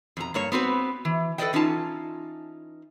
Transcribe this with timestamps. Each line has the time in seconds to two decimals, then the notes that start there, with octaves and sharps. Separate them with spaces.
0.17 F2 B2 A#5
0.34 G2 A#3 C#5
0.52 B3 C4 F#4 B4
1.05 E3
1.38 A4 B4 C5 D5 D#5 G5
1.53 E3 C#4 D#4 F4 A5